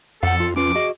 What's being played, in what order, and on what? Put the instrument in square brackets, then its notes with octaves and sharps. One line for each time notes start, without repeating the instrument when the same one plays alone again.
[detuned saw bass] F2 [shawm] A4 [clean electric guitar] F5 F#5
[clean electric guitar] F4
[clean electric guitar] C#4 F4 B4 [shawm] D6
[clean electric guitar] F#4 G#4 D#5